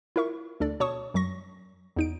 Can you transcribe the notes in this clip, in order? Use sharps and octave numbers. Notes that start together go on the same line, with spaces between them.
E4 F4 A#4 E5 C#6
D2 D4 A4 D5
B2 C#5 A5 C#6 D#6
F#2 F#3 C#6 A#6
E2 D#4 D7